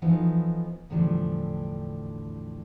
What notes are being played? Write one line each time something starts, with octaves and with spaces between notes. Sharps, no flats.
E3 F3 B3 D#4 A4
E2 A2 D3 F3 G3 D4